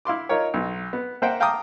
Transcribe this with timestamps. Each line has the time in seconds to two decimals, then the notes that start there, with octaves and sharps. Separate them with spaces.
0.05 E4 F5 C6 D6
0.29 D#4 F4 A#4 C#5
0.54 B1
0.93 B3
1.22 A#3 C5 E5 F#5 G5
1.40 F5 G5 A5 A#5 D6 D#6